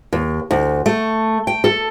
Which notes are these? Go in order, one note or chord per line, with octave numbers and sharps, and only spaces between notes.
D#2
D2
A3
G5
A4